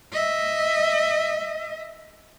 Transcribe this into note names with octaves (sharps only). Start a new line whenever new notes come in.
D#5 E5